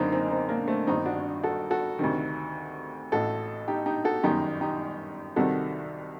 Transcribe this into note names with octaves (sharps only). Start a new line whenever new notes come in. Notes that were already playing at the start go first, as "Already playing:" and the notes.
Already playing: F#1 F#2 D3 A#3 C4 D4 D#4
C4 D#4
C4 D#4
A#3 D4
A3 C4
G1 G2 D#3 C4 D#4
D4 F#4
F#4 A4
F#4 A4
D2 C3 D#3
A1 A2 F#4 A4
D#4 G4
D#4 G4
F#4 A4
G1 F#2 D#3 D#4 G4
D#4 G4
C2 C3 D#3 F#4 A4